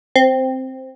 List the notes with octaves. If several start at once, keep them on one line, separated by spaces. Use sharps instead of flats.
C4